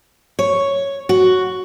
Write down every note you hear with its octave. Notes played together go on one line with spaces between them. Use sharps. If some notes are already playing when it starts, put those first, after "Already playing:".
C#5
F#4